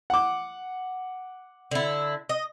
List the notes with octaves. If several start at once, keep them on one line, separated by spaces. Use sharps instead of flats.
F#5 D6
D3 E4
D#5